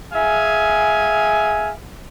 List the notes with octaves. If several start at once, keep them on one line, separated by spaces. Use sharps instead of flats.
G#4 E5 F5 G#5